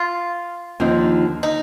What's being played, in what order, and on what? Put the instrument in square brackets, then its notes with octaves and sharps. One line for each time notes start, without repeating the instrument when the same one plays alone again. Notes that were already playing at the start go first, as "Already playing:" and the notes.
Already playing: [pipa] F4
[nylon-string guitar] D#2 D3 F3 C4 D#4
[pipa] D#4